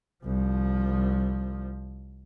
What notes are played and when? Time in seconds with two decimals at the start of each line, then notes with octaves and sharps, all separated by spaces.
0.24 C2 F3